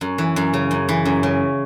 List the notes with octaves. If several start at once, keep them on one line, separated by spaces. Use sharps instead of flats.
F#2
E3
F#2
C#3
F#2
E3
F#2
C#3